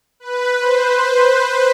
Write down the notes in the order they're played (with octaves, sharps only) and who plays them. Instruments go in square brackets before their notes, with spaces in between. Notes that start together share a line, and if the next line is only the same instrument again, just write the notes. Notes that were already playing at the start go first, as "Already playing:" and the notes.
[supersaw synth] B4
C5
C5